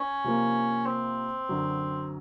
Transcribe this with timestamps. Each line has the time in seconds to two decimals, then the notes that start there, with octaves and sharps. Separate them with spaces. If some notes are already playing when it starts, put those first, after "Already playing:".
Already playing: C#4
0.24 C3 F3 A#3
0.86 C4
1.49 F#2 D3 F#3